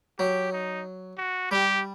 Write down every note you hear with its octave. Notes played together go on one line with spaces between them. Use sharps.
F#3 G4
D#4
F#4
G3 G4